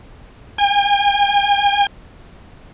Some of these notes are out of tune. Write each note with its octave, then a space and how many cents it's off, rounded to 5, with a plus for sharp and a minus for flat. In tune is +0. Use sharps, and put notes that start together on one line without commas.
G#5 -45